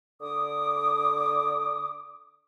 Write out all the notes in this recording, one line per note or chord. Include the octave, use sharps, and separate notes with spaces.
D3 D6 D#6